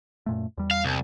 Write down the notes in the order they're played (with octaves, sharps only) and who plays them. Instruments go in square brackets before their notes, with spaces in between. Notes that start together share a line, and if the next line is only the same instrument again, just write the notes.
[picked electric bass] F#2 A#2 A3
E2 G3
[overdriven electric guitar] F5
C2